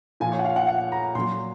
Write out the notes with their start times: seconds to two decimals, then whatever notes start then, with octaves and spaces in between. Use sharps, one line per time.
0.20 A#2 F3 G#5
0.32 C#5
0.39 F#5
0.45 F5
0.56 F#5
0.68 F#5
0.92 A#5
1.15 A#2 C6
1.18 F#3